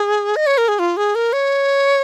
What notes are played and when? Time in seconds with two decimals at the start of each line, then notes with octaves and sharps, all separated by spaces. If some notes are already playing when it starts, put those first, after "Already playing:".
Already playing: G#4
0.36 D#5
0.46 C#5
0.58 A#4
0.68 G#4
0.79 F4
0.97 G#4
1.15 A#4
1.33 C#5